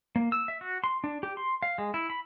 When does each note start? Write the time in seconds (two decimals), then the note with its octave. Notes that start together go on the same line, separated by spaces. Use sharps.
0.16 A#3
0.32 E6
0.48 E5
0.61 F#4
0.84 C6
1.04 D4
1.23 G4
1.37 C6
1.63 F5
1.78 G#3
1.94 E4
2.10 B5